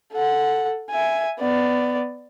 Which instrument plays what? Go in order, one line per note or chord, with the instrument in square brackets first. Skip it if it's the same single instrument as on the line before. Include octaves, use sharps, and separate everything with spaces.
[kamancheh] A4 F#5
E5 G#5
B3 D5